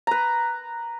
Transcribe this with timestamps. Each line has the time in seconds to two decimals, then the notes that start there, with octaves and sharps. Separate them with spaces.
0.07 B4 A#5